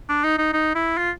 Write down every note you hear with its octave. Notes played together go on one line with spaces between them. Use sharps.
D4
D#4
D#4
D#4
E4
F4